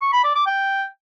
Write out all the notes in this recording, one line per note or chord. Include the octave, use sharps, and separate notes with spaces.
C#6
B5
D5
D6
G5